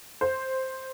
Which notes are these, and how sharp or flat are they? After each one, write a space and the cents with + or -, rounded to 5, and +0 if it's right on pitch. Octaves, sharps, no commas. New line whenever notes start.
C5 +5